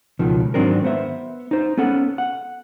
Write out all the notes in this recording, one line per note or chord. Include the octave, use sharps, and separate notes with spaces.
C#2 B2 D#3 F3
G#2 D#3 F#3 C4 D4 A#4
B3 C5 E5
D#4 C5
B3 C#4 A4 F#5
F#5